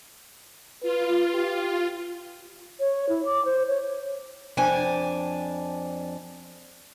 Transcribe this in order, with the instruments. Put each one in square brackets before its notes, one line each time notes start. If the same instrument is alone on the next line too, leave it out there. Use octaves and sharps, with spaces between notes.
[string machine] F4 [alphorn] B4
[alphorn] G4
[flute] C#5
E4
D6
C5
C#5
[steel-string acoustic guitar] F2 D4 G5 G#5